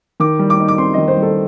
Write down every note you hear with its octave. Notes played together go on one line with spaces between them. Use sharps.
D#3 D6
G3
D6
D#4
D6
C4 C6
D#3 D#5
C5
G3
A4